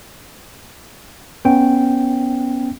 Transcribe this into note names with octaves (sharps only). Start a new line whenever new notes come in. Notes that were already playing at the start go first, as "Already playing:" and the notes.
B3 C#4 G5